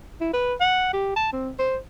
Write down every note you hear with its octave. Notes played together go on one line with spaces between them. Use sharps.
E4
B4
F#5
G4
A5
C4
C5